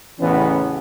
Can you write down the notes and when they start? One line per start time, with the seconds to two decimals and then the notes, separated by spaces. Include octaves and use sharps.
0.20 A1 E2 C#3 E3 B3 C#4